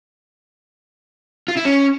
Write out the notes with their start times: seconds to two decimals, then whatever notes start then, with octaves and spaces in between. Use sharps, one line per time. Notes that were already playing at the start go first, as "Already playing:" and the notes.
1.48 F4
1.57 E4
1.65 C#4